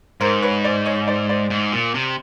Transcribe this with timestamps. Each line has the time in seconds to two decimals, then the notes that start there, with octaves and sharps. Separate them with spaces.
0.21 G#2 A#4 C5
0.42 B4 C#5
0.64 C5 D5
0.85 C#5 D#5
1.07 C5 D5
1.29 C5 D5
1.50 G#2
1.72 A#2
1.94 C3